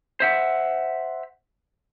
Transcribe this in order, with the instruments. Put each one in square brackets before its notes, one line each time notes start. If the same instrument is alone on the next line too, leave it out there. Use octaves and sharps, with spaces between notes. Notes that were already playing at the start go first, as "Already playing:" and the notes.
[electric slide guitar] C5 E5 F#5